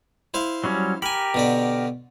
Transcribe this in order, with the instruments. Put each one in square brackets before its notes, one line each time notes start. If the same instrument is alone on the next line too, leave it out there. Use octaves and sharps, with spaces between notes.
[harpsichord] E4 C5 F5
[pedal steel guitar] F#3 G3 C#4
[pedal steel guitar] G4 A#4 [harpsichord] G#5 B5
[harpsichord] B2 D3 D5